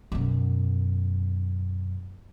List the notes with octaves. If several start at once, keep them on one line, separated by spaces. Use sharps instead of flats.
F#2 B2